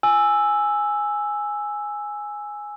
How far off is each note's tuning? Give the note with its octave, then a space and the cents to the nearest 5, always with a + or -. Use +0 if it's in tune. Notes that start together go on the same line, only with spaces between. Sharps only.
G#5 +0 E6 +0